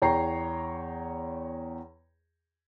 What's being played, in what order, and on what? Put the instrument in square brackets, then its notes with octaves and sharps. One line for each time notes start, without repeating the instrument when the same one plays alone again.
[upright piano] E2 C#5 G5 A#5 C7